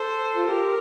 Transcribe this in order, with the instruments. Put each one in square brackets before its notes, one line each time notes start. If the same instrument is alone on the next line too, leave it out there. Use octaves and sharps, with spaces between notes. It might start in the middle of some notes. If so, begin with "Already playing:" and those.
Already playing: [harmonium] A4 [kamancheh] C5
[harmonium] F4
[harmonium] G4 [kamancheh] A#4